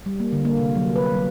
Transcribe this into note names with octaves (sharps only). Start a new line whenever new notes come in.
G3
A#3
D3
A#3
C3
F#3
B4
F#3